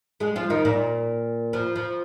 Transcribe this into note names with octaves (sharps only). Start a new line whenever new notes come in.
G#3 G#4
F3 F4
D#3 D#4
A#2 A#3
F3
F3